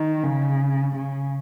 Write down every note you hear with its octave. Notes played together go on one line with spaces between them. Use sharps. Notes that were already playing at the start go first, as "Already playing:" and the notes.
Already playing: D#3
C#3
C#3